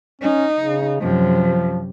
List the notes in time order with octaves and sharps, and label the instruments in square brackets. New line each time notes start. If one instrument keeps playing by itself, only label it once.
[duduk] C#4 [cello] D#4
[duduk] C#3
[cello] F#2 C3 [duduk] F3